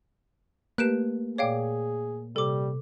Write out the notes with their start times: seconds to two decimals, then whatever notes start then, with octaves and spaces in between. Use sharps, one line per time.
0.78 A3 A#3 G4 B4 F#6 D7 E7
1.38 A#2 G#4 C#5 D5 F5 G5 D6
2.36 C3 G3 A4 D6